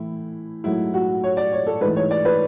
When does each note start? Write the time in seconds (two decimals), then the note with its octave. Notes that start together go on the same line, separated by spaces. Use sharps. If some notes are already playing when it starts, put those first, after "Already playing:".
Already playing: A2 E3 A3 E4
0.64 G#2 F#3 A3 E4
0.94 F#4
1.24 C#5
1.37 D5
1.53 C#5
1.67 A4
1.81 G#2 E3 A3 B4
1.96 C#5
2.11 D5
2.25 B4